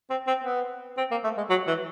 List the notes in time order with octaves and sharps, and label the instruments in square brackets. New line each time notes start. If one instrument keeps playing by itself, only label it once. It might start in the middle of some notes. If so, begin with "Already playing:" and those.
[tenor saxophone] C4
C4
B3
C4
A#3
A3
G#3
F#3
E3